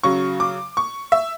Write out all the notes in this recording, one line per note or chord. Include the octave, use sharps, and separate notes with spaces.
C#3 F#3 C#6
D6
C#6
E5